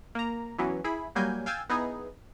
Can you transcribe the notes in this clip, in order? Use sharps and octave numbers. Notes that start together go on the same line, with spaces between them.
A#3 A#5
E3 F#3 B3 C#4
E4 G#4 B5
F#3 G3 A#3 G#5 G6
F5 G5 G#5 E6 G6 A6
B3 D#4 E4 G#4